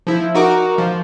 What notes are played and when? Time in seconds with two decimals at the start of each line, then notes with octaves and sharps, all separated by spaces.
0.07 F3 E4
0.35 D#4 F#4 A#4 D6
0.78 F3